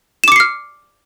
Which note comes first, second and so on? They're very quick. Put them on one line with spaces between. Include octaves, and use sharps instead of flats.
E7 D6 C#7 C7 F6